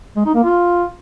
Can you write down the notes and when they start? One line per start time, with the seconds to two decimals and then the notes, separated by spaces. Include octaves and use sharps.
0.16 G#3
0.25 D#4
0.35 A#3
0.44 F4